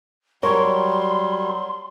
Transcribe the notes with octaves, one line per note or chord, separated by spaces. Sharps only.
F#3 G3 A#4 C#5 C6